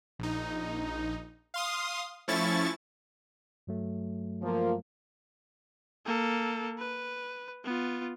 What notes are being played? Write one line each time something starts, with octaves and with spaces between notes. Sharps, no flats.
A#1 D#4
F5 C6 D#6
F3 A3 C#4 E4 C#6 A6
G2 F#3 A3
F3 A#3
A#3 A4
B4
B3 F4